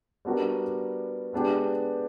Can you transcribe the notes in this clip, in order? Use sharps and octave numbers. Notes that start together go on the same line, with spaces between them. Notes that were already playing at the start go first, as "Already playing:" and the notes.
G3 B3 D4 F#4 A#4
G#3 B3 D4 G4